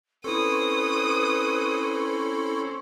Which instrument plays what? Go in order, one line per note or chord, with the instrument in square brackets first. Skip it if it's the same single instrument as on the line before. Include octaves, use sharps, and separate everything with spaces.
[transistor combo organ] C4 C#4 [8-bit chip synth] E4 A4 [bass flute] B4 [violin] D#6